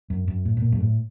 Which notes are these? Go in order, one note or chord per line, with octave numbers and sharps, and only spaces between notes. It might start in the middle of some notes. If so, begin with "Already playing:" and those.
F#2
F#2
A2
A2
A#2
F#2
A2